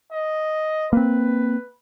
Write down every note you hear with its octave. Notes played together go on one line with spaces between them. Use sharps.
D#5
A#3 C4 B4